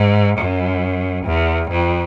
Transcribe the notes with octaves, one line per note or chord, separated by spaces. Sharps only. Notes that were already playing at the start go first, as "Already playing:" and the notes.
Already playing: G#2
F#2
E2
F2